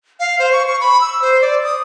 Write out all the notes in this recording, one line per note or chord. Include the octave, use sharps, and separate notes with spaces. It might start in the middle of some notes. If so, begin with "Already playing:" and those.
F5
C5
C#6
C#6
B5
E6
C5
D5
D#6